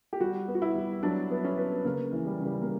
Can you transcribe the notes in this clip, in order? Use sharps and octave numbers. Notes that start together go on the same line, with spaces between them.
G4
G3 F#4
B3
F#4
E4
G3
F#3 D4
B3
C#4
B4
C#3 A#3
E3
G3
C#3
G3
A#3